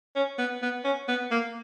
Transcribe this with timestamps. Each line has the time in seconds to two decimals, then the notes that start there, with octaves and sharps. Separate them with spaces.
0.16 C#4
0.38 B3
0.62 B3
0.85 C#4
1.08 B3
1.31 A#3